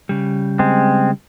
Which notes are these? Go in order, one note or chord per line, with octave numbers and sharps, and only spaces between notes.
C#3 G3
G#3 C4